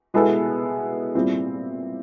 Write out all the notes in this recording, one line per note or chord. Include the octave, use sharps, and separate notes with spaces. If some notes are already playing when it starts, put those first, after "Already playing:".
B2 G#3 B3 E4 A4
A#2 G3 C4 E4